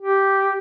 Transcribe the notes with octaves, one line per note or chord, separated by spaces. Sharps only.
G4